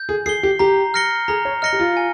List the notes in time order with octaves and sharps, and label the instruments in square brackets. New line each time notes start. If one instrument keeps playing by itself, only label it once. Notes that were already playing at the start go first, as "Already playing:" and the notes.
Already playing: [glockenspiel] G6
[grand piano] G#4
[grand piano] G#4 [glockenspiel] C7
[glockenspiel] G7
[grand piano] G4
[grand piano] G4 [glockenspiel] A#5
[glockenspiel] F6 A#6 C#7 G7
[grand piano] G#4 [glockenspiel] A#5
[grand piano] C#5
[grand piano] D#5 [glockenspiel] F6 A#6 C#7 G7
[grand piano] G4
F4
[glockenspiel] G#5